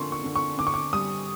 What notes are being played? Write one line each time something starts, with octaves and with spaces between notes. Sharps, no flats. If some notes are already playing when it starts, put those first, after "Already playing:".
Already playing: D3 F3 A#3 C6 C#6
C#6
D3
C#6
D3 D6
C#6
D6
G3 D#6